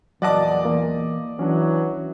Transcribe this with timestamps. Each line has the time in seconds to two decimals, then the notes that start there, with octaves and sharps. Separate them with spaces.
0.22 E2 A#2 F#3 D5 D#5 F#5 A5 D6
0.64 E3 A#3
1.39 E3 F#3 C#4 D4